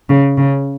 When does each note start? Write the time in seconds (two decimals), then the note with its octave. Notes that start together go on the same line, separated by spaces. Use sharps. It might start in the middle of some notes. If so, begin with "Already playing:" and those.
0.09 C#3
0.38 C#3